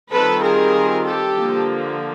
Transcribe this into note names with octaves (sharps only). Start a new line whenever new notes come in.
D#3 G3 C4 F4 A4 B4
G#4 A#4
G4 A4
D3 F3 A#3